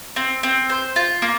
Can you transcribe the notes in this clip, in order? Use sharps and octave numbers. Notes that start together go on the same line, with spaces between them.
C4
C4
C5
F4
A#3